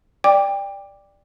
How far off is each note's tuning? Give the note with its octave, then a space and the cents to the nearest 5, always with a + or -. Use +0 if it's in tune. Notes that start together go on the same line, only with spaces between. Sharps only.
D5 +0 G5 +20 D6 +0